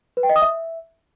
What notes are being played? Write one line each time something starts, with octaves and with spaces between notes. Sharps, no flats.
B4
G5
D#5
D#6
E5